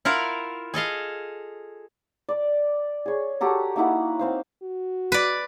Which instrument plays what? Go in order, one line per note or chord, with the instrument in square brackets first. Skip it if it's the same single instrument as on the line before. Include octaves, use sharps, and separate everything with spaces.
[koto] E4 F4 A#4 F5 F#5
G#4 A4 D#5 F5
[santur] D5
G#4 C#5
F#4 G4 A4 A#5
A#3 D#4 E4 F#5
C4 C5 F5
[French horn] F#4
[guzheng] B4 D5